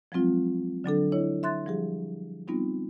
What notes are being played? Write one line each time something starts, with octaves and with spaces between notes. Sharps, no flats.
F3 F#3 G#3 C4 F4
D3 F#3 D4 A4
E4 C#5 D#5
E5 C6 F#6 A6
F3 G3 G4 G#4
G3 B3 C4 D#4 F4